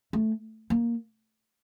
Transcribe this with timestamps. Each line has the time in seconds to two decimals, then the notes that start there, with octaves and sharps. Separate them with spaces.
0.13 A3
0.70 A#3